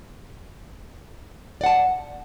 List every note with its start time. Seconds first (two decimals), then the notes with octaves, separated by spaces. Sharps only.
1.61 D5
1.64 F#5
1.66 A5